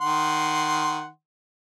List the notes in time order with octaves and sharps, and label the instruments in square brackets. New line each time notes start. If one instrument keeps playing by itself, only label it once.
[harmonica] D#3 F#5 C6